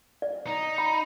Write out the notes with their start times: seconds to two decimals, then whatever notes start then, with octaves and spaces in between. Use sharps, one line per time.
0.22 D5
0.47 D#4
0.78 B5